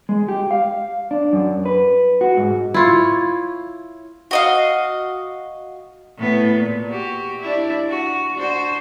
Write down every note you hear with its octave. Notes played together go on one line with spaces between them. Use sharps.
G#3
G4
F5
D4
F#2
B4
F#4
G#2
E4 F4 C#5
F#4 D#5 F5
A2 B3 B4
A#2
F#4 G4
D4 E4
F#4
D4 F#4 C5